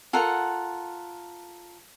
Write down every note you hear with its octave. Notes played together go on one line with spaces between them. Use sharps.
F4 A4 A#4 F#5